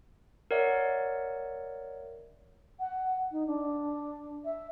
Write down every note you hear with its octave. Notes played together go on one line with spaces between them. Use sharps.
A#4 C#5 D5 E5 F#5
F#5
D#4
D4
E5